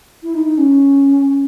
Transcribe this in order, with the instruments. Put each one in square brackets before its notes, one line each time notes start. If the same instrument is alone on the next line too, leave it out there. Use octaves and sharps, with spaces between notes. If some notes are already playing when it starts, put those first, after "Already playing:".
[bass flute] E4
D#4
D#4
C#4